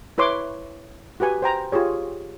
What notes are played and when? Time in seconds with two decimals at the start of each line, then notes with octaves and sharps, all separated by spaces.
0.18 E4 B4 C#5 C6 D6
1.20 F#4 G4 B4 G#5
1.42 C5 G5 A#5
1.72 F4 G4 G#4 C#5